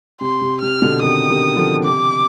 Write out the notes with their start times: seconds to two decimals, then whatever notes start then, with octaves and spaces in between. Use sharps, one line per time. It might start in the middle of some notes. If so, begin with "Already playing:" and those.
0.21 C3 C6
0.41 C3
0.61 C3 F6
0.82 B2 D3
1.02 C3 D#3 D#6
1.30 C3 D#3
1.56 D3 F3
1.84 C3 D6